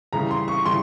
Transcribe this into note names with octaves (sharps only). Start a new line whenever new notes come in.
C#3 E3 G3 A#5
C6
C#6
C#3 E3 G3 C6